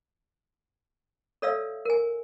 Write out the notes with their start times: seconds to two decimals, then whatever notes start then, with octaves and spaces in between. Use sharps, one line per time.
1.42 A4 C#5 D5 E5 F5 E6
1.85 A#4 G#5